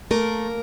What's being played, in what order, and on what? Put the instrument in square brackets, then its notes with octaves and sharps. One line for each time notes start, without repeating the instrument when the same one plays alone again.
[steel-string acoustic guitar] A3 A#3 A#4